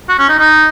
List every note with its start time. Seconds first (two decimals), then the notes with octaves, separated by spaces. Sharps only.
0.09 F#4
0.19 C#4
0.29 D#4
0.39 D#4